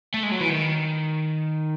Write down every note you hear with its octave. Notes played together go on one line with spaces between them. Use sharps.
A3
G#3
F#3
E3
D#3